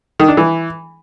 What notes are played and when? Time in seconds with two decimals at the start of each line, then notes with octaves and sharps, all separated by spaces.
0.20 D#3
0.28 D4
0.37 E3